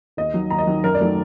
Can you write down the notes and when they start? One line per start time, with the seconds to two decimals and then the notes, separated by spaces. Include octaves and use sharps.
0.17 D#2 D#5
0.34 D#3 F#3
0.50 D#2 A#5
0.58 D#5
0.67 D#3 F#3
0.84 F#2 A#4
0.95 D5
1.01 D#3 F#3 A3